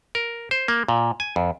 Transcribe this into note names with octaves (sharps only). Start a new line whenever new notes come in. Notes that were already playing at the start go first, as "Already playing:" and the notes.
A#4
C5
A#3
A#2
G#5
F2